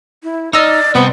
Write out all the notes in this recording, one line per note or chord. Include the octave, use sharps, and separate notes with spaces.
E4
D#4 D5 D#5 E6 F6
C3 G3 B3 C5